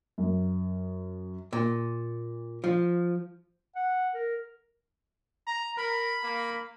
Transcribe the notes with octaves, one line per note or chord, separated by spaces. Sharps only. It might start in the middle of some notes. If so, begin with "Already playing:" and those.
F#2
A#2
F3
F#5
A#4
A#5
A#4 B5
A#3